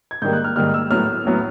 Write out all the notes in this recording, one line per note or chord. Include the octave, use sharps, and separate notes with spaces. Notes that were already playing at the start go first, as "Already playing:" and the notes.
G#6
G#2 D#3 G3 A#3 G6
F#6
F6
G#2 D#3 G3 A#3 F6
E6
A2 F#3 B3 F6
A2 F#3 B3